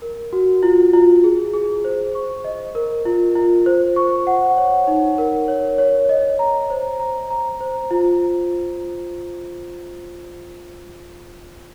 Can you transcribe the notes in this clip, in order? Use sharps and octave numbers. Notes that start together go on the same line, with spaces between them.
A#4
F#4
F4
F4
G#4
G#4
C5
C#6
D#5
A#4
F4
F4
C5
C#6
F#5
C#5
D#4
A#4
C#5
C#5
D#5
A#5
C5
A#5
A#5
C5
F4